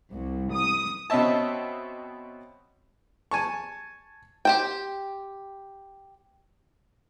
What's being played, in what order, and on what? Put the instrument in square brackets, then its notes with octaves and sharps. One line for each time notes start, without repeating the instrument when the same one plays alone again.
[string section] C2
D#6
[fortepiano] B2 C4 C#4 D#5 E5 A5
G#5 A5 C#6
[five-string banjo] G4 C5 G5